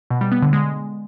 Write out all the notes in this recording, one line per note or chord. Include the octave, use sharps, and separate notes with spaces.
B2
G3
B3
D3
G#3